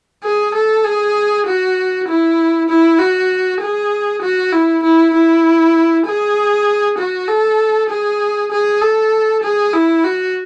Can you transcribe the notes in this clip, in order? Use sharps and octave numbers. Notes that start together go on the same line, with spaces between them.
G#4
A4
G#4
F#4
E4
E4
F#4
G#4
F#4
E4
E4
E4
G#4
F#4
A4
G#4
G#4
A4
G#4
E4
F#4